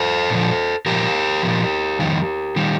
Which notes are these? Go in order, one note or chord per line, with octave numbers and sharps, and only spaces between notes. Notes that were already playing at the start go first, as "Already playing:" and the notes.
Already playing: A4 C5
A#2 F3
A#2 F3 G4 A#4
A#2 F3
F2 D#3 G3
D#3 G3